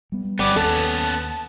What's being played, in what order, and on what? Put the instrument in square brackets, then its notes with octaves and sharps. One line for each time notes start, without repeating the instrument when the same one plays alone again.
[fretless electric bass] G3 B3
[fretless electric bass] G1 [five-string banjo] G3 [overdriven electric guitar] B3 C#4 [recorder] D6
[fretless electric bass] D#2 [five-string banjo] A4 [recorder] A5